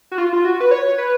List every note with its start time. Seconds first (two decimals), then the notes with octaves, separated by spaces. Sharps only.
0.11 F#4
0.18 F4
0.33 F4
0.45 F#4
0.60 B4
0.71 C#5
0.98 B4